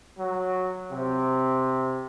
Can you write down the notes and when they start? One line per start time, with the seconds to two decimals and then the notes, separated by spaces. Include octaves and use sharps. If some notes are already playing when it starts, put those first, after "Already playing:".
0.18 F#3
0.91 C3